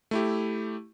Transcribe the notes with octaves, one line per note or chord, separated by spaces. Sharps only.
A3 E4 G4